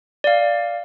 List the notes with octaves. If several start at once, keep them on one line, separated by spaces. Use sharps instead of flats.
D5 F5